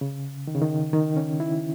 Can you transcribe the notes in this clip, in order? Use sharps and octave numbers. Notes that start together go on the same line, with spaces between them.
C#3
D#3
C#3
D#3
D#3
C#4
E4